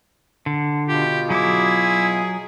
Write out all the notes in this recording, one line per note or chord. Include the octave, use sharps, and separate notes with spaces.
D3
B2 F4 G4
F#3 E4 G#4 D6